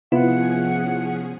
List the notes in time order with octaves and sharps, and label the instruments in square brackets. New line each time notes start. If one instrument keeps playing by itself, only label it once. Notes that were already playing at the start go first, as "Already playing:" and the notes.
[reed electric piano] C3 B3 F4 [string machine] F3 C#4 G#4 [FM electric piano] E4 [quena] F#5